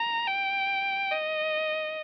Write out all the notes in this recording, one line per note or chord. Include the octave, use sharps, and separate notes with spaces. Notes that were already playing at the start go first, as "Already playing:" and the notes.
Already playing: A#5
G5
D#5